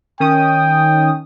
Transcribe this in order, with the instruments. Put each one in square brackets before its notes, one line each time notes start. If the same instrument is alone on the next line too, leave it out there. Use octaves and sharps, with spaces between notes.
[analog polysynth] D#3 C#4 D#6 [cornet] G5